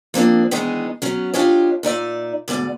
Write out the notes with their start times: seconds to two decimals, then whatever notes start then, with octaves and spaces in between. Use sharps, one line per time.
0.14 F3 A#3 C4 D4
0.51 D#3 E3 G#3 B3 D#4 G#4
1.02 F#3 B3 C#4
1.34 D4 F4 G4 C#5 D#5
1.83 A#2 D#4 D5 E5
2.48 D2 G#2 B3 D5